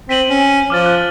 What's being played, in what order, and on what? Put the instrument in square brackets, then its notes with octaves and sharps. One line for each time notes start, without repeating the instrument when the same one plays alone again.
[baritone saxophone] C4 [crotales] B6 D#7 F#7
[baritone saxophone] C#4
[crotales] D#7
[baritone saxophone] F3 [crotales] D6 F6 A6
[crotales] F#6